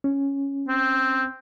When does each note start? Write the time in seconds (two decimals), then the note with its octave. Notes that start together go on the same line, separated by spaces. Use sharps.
0.04 C#4
0.68 C4